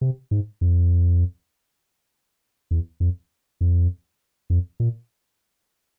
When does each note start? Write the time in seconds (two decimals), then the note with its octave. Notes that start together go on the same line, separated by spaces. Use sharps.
0.01 C3
0.31 G#2
0.61 F2
2.71 E2
3.00 F2
3.61 F2
4.50 F2
4.80 A#2